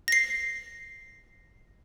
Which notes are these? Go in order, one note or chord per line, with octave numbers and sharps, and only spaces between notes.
A#6 C7